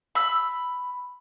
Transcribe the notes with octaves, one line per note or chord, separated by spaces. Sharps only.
B5 E6